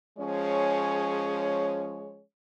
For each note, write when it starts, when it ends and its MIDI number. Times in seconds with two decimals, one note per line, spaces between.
0.18 2.21 53
0.18 2.21 56
0.18 2.21 61
0.18 2.21 68
0.18 2.21 73